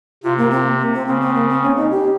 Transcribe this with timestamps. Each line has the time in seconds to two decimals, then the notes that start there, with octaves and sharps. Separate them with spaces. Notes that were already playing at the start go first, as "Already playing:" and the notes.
0.23 C3 F4
0.38 A#3
0.51 C4
0.79 A#3
0.93 C4
1.07 C#3 C4
1.21 C4
1.35 A#3
1.49 C4
1.63 C#4
1.77 D#4
1.91 G4